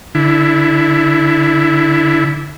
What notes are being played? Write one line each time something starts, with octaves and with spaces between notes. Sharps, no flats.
D3 E4